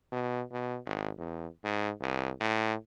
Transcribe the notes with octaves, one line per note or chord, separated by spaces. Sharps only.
B2
B2
G#1
E2
G#2
C2
A2